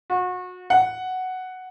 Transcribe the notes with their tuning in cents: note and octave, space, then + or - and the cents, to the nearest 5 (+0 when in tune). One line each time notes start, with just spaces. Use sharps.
F#4 -30
F#5 +5